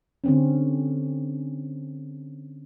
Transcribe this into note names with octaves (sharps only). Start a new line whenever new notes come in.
D3 C4 C#4